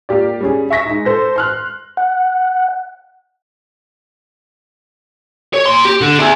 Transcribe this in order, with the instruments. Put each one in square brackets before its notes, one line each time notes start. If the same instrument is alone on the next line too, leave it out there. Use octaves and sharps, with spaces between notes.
[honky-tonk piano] A#3 F4 G4 D5
G3 C#4 G#4
E5 C#6 A#6 B6
G#3 D#4
A4 C5 A#6
C6 F6 F#6
[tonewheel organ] F#5
[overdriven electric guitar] C#5
A#3 C6
G4
D3
G#4 E5